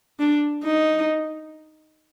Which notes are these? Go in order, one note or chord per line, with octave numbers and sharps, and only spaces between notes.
D4
D#4